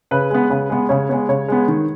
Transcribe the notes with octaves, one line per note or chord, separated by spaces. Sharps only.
C#3 B4
G#3 B3
C#3
G#3 B3
C#3 C#5
G#3 B3 C#5
C#3 C#5
G#3 B3
D#3